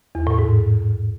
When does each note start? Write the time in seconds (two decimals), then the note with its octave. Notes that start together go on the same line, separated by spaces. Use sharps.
0.15 E2
0.27 A2
0.39 G#2